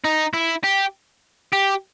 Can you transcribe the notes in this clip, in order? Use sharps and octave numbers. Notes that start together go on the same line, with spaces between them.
D#4
E4
G4
G4